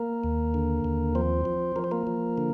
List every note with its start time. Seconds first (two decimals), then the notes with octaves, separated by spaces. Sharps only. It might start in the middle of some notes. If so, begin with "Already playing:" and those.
Already playing: A#3 A#4
0.24 D#2
0.54 D3
0.84 D#2
1.15 F3 C4 C5
1.45 F3
1.76 F3 A#4
1.84 C5
1.91 A#3 A#4
2.07 F3
2.38 D3